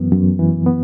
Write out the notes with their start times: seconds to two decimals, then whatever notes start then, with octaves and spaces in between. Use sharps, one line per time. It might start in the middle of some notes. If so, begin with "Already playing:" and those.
Already playing: F#2 E3 B3
0.11 F#2
0.39 E3
0.66 B3